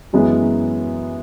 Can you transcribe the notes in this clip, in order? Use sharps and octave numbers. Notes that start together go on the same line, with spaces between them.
F#2 E3 G#3 B3